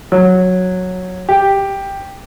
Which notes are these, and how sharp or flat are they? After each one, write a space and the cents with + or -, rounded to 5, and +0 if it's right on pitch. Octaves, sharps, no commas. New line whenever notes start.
F#3 -10
G4 +5